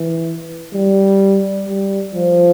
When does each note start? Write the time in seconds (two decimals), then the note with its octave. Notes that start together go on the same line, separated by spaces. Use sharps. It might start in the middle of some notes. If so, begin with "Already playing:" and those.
Already playing: E3
0.74 G3
1.67 G3
2.15 F3